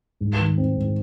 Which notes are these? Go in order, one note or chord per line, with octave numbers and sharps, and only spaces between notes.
G#2
D#3
C4
G#2